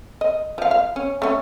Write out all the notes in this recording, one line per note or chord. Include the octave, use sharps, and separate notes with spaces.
D#5
F3 F5
F5
C#4
A3 C#4